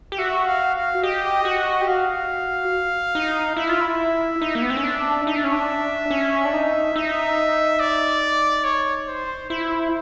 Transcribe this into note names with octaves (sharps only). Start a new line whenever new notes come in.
G4
F#4 E5
F5
F5
G4 D#5
F#4
G4
F#4 F5
D#4
E4 E5
F4
E4
D#4
A#3
B3
C4
C#4
D4
D#4 E5
D4
C#4
D4
C#4
D4
D#4
D#4 E5
D5
C#5
C5
E4 C5